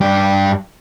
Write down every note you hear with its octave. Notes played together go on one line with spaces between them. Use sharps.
G2 G4